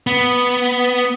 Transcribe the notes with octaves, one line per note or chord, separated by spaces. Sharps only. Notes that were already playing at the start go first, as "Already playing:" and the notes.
B3